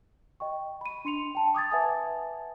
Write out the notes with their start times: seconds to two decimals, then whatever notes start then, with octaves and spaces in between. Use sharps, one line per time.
0.40 D#5 G5 C#6
0.81 B5 D#7
1.05 D4 C6 C#7 F7
1.35 G5 A5
1.55 D6 D#6 G#6 A6
1.71 B4 E5 F#5 G#5 A5 D#6